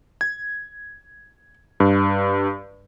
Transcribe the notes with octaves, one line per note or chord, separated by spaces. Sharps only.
G#6
G2